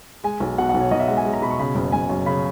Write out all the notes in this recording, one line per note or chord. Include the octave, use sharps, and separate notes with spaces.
G#3 G#5
B1
B2 F#5
F#5
B1
C#5
B1 D#5
E5
G#3 F#5
G#5
G#3
A#5
B2 B5
C#6
C#3 B5
F#1
F#1 G#5
F#2
C#3 B5